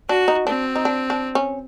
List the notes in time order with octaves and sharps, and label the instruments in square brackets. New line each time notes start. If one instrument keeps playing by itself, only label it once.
[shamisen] D4 [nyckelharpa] F#4
[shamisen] D#4
[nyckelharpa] C4 [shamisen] D4
[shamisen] D#4
D4
D4
C#4